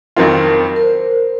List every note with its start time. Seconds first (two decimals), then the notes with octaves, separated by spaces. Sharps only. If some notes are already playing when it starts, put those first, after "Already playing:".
0.16 F2 D#3 F#3 C4 F4 A#4
0.76 A#4
0.83 C5